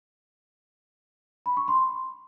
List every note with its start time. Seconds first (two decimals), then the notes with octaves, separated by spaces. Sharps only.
1.46 B5
1.57 C#6
1.68 C6